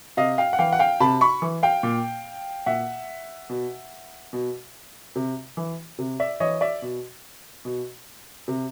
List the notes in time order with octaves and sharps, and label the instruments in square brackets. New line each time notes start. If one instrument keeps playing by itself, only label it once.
[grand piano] C3 D#5 F5
F5 G5
F#5
E3 F5 G5
F#5
F5 G5
C3 A5 B5
B5 C#6
E3
F5 G5
A#2
A#2 E5 F#5
B2
B2
C3
E3
C3
D5 E5
E3 C#5 D#5
D5 E5
B2
B2
C3